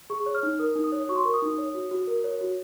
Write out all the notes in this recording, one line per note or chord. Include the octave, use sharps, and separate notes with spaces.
G#4 C#6
C#5
F6
D#4
A#4 D#6
D#4
D#6
C#5
F#4 C#6
C6
A#4 C#6
D#6
D#4
C#5
F#4
F#4
A#4
C#5
F#4